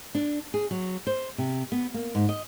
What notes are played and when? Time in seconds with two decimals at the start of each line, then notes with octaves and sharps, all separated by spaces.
0.15 D4
0.54 G#4
0.71 F#3
1.07 C5
1.38 C3
1.72 B3
1.94 A#3
2.15 G#2
2.29 D#5